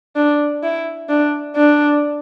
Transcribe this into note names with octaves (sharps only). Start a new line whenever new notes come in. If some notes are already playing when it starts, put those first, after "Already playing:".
D4
E4
D4
D4